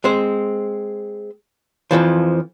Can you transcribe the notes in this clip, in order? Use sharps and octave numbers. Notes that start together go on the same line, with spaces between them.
G#3 C4 C5
F2 B2 E3 F3